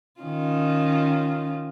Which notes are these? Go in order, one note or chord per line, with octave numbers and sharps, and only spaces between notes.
D#3 C#4 F4